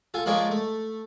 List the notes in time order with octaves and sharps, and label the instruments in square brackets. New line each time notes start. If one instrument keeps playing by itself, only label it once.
[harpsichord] F4 A4 G#5
F3 G#3 A#3 G#4 C#5 D5
A3